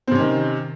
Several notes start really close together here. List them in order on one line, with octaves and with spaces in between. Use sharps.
C4 C3 C#4 D#3